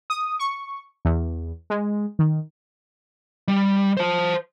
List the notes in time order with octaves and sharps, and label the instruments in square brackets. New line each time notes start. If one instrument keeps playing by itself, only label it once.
[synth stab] D#6
C#6
E2
G#3
D#3
[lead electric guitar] G3
C5 A5